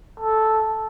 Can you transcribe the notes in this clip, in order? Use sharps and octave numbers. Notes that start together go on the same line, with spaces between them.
A4